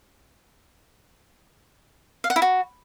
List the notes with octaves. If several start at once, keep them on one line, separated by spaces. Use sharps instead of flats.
F5
F#5
E4
F#4